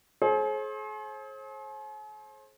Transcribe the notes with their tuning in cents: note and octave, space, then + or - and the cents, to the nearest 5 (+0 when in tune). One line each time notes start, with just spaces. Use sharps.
G#4 +45 C5 +40